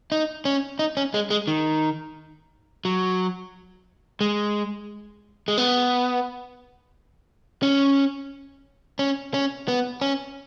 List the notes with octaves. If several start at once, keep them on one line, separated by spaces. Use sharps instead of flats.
D#4
C#4
D#4
C#4
G#3
G#3
D#3
F#3
G#3
G#3
B3
C#4
C#4
C#4
B3
C#4